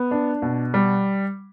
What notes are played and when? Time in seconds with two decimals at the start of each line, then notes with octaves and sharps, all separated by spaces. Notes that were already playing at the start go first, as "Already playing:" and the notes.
Already playing: B3
0.11 D4
0.42 B2
0.74 G3